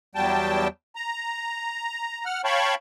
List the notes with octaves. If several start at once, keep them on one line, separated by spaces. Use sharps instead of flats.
E2 F#3 G3 G5 A5
A#5
F#5 F6
C#5 F5 G5 A5 B5 C#6